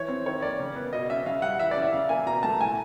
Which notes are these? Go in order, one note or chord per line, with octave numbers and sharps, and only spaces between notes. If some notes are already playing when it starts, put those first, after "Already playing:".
Already playing: E3 C#5
C4
D#3 C#5
A#3 D5
C#3
B3
B2 D#5
C#4 E5
C#3 F5
G3 F#5
E3 E5
D5
C#4
E5
C#3 F5
A#3 G#5
B2 A#5
A3 A5
A2 G#5